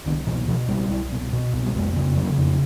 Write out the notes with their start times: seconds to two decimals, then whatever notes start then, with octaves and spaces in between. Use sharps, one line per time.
0.06 C2 D#3
0.27 B2 E3
0.48 B2 F3
0.69 C2 G3
0.91 C2
1.12 B2
1.32 B2
1.53 C2
1.66 G3
1.75 F2 G#3
1.96 C#3
2.17 C#3 F#3
2.38 F2